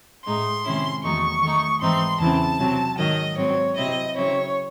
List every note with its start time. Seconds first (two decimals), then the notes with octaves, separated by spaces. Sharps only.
0.25 A2 G#3 D#4 C6
0.64 C3 D#3 G#3 C#4 E4
1.03 E2 D#3 F#3 A3 D#4 C#6
1.42 D#3 A3 D#4
1.81 G#2 E3 C4 D#4 C6
2.20 E2 C#3 E3 C4 A5
2.59 C3 F#3 C4
2.98 G#2 D#3 F#3 D#5
3.37 G#2 F#3 C4 C#5
3.75 C3 F#3 C4 E4 D#5
4.15 C#3 F#3 C4 E4 C#5